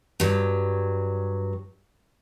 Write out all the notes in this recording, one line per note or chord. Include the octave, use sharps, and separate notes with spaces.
G2 F#3